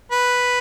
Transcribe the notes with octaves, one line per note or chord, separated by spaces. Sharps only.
B4